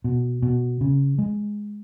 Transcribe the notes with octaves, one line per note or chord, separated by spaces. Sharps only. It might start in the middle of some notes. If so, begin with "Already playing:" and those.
B2
B2
C#3
G#3